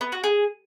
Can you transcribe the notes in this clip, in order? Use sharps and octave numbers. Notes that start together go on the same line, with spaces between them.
B3
F#4
G#4